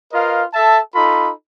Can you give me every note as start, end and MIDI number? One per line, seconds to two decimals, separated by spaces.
0.13 0.43 65
0.13 0.43 70
0.13 0.43 71
0.13 0.43 75
0.13 0.43 77
0.54 0.79 69
0.54 0.79 76
0.54 0.79 81
0.94 1.31 63
0.94 1.31 65
0.94 1.31 69
0.94 1.31 83